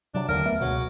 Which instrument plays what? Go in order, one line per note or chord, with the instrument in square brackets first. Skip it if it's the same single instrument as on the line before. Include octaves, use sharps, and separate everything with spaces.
[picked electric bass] C3 F#3 [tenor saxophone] D4
[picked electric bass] F1 D#2 D3 [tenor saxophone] A#4
[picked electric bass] A3 B3
[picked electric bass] C#2 B2 [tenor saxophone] F#3